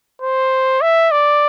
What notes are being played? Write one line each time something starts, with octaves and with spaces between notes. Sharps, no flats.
C5
E5
D5